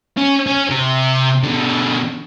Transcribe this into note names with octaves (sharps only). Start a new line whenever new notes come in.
C#4
C#4
C3
B2 D3